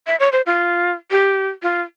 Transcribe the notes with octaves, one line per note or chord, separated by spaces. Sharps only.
E5
C#5
C5
F4
G4
F4